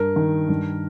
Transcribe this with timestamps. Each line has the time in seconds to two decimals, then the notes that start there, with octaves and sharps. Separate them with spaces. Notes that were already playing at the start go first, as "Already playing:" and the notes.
Already playing: G2 A#4
0.16 D#3
0.49 G2